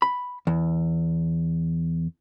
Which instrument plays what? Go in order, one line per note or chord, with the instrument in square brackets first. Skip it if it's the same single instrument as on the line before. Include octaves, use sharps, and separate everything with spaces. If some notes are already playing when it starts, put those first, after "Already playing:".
[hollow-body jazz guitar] B5
E2